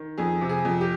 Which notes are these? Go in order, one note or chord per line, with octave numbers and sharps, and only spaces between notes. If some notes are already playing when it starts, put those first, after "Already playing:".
Already playing: D#3
F2 G#4
C3
G#4
F2
G4